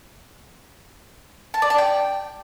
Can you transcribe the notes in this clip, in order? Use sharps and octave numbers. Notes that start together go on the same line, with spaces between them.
A5
D5
A5
G5